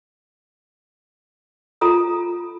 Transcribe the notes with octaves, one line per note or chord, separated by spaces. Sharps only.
F4 A4 A#5 D#6